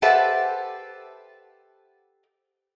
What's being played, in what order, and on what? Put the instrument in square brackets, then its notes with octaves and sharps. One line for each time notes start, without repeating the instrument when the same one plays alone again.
[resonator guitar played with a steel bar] G4 A4 B4 C5 E5 F#5